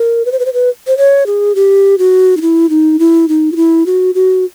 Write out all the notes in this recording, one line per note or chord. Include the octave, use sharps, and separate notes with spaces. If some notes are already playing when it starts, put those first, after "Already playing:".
Already playing: A#4
B4
C5
B4
C5
B4
C5
C#5
G#4
G4
F#4
D#4
E4
D#4
E4
D#4
F4
E4
F#4
F#4